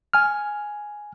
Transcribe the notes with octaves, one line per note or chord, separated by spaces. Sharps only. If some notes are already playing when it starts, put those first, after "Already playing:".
G#5 F6